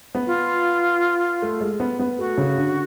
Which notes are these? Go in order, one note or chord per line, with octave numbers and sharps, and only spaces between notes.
B3
F4
A3
G#3
B3
B3
A3 F#4
C#3
D3